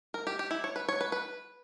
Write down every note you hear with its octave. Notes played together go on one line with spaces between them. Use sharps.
A#4
G4
G4
E4
C#5
B4
C#5
B4
B4